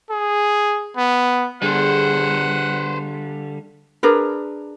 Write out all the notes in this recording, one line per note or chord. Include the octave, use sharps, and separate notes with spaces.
G#4
B3
D3 G3 G#4 B4 C5 F#5
D4 G#4 A#4 B4